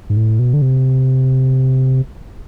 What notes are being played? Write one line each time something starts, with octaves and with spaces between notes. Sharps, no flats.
G#2
A2
B2
D3
C3